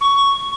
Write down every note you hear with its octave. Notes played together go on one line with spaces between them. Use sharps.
C#6